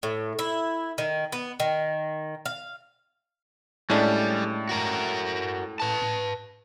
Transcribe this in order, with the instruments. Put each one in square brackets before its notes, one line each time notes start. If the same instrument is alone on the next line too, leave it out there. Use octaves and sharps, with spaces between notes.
[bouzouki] A2
E4
D#3
B3
D#3
F5
[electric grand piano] A2 [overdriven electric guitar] G3 [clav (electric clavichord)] G#3 C#4 D4
[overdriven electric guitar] F#4 A#4
B4 A5